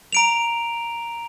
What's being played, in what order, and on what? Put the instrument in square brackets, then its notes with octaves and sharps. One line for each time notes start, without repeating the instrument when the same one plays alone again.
[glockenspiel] A#5 D7 F7